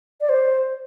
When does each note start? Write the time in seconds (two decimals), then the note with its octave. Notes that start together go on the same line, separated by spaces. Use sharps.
0.21 D5
0.29 C5